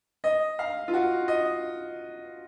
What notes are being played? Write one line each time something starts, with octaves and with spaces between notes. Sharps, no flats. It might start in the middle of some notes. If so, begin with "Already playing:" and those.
D#5
F5
F4
F#4
D#5